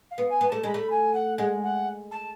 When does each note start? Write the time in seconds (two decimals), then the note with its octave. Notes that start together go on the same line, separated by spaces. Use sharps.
0.11 F5
0.18 B3
0.29 G#5
0.41 B3
0.48 A3 A5
0.63 G#3 B5
0.74 A3
0.90 G#5
1.13 F#5
1.38 G#3 F#5
1.62 F#5
2.11 A5